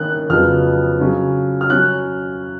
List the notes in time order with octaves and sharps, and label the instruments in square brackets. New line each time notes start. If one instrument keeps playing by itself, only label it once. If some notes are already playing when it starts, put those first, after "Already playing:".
Already playing: [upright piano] D#3 A#3 C#4 F#6
F2 C#3 F#3 B3 F6
C#3 F#3 C#4
F6
F#3 C#4 F#6